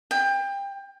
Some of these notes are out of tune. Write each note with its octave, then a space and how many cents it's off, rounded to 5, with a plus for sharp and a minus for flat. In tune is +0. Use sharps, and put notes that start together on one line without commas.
G5 +25